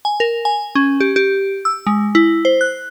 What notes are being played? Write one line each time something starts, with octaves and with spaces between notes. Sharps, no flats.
G#5
A#4
G#5
C#4
G4
G4
E6
G#3
E4
C5
F#6